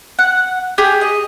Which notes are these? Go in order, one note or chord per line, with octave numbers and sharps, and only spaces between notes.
F#5
G4 G#4
D#5